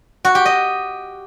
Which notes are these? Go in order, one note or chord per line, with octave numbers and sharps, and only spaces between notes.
F#4
G4
D#5